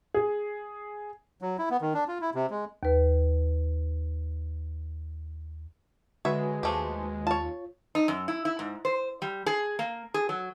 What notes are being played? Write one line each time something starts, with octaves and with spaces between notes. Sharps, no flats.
G#4
F#3
E4
B3
D#3
D4
F4
E4
C3
G#3
D#2 B4
D3 G#3 F#4 B4 C#5 E5
D#2 F3 A3 G4
F4 C#5 A5
D#4
F#2
E4
E4
G#2
C5
G3
G#4
A#3
G#4
F#3